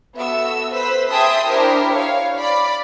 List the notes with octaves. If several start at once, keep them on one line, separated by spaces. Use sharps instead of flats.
B3 F#4 A4 E5 E6
B4 C5 E6 B6
G#4 E5 G5 A5 C6 D#6
D4 E4 G4 A#4 C5
C#5 F5
D5 B5